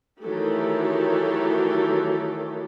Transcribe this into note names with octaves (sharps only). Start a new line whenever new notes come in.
D#3 E3 F#3 A3 G4 A4